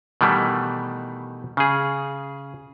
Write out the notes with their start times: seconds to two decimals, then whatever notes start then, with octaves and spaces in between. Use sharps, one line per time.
0.21 B2 D#3 E3 G3 A3
1.57 C#3 G#4